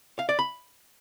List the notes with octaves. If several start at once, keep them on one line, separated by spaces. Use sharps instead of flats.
F5
D5
B5